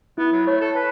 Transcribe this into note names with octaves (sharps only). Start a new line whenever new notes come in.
B3 E4
F#3
A3 C#5
A4
B4 A5